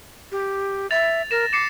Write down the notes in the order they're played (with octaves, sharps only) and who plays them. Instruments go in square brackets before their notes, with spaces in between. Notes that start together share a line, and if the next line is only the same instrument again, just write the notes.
[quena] G4
[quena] E5 [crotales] A6 F7
[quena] A#4 [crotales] A#6 E7
[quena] D6 [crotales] C7 C#7 E7